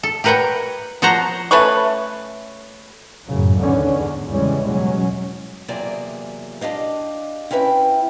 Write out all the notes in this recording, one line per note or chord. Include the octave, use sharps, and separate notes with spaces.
A4
G4 A#4 B4 C#5 F#5 G5
F3 F#4 C5 C#5 F#5 A#5
A3 C#4 B4 C#6
F#2 A2 C#3 F#3
D#2 G#2 D3 B3 C#4
E2
E2 C#3 E3 G3 G#3 C#4
B2 F#3 C#4
E2 C3 F#3 A#3 G#4 D5
D4 G4 D#5 F5
C4 C#4 E4 B4 E5 G5